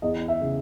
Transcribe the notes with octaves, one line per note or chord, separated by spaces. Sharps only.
E2 D#5
E5
C#3